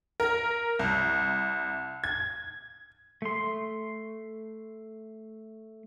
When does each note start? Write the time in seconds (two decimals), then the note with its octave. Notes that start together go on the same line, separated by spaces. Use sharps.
0.20 A#4
0.79 C2
2.04 G#6
3.22 A3 C6